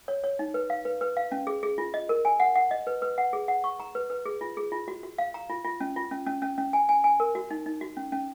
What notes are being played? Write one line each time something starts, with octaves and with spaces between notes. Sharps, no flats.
C#5
C#5
D#4
B4
F5
B4
B4
F5
C#4
G#4
G#4
F4
D#5
A#4
G#5
F#5
F#5
D#5
B4
B4
F#5
G#4
F#5
C#6
A#5
B4
B4
G#4
F4
G#4
F4
F#4
F#4
F5
A#5
F4
F4
C#4
F4
C#4
C#4
C#4
C#4
G#5
G#5
G#5
A#4
F#4
D#4
D#4
F#4
C#4
C#4